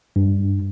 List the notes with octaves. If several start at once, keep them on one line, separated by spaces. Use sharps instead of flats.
G2